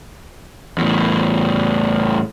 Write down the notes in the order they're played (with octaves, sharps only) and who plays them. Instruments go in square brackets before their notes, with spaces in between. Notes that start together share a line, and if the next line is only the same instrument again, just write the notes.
[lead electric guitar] E2 A2